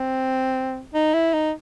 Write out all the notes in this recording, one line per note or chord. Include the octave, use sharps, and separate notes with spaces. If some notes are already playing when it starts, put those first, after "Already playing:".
Already playing: C4
D#4
E4
D#4